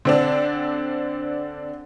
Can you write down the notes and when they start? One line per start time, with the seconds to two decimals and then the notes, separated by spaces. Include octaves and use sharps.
0.05 D3 C4 D4